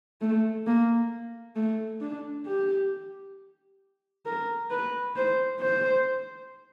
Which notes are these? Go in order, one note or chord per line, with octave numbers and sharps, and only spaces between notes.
A3
A#3
A3
D4
G4
A#4
B4
C5
C5